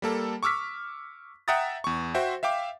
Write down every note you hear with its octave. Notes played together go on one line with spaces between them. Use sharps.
G3 A#3 A4
C#6 D6 E6 F6 B6
E5 F#5 G5 A#5 D#6 A6
E2 C#6
F#4 C5 E5 G5
E5 F5 G5 D6